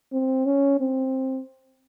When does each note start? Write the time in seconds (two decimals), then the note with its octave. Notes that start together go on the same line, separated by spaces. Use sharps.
0.13 C4
0.46 C#4
0.80 C4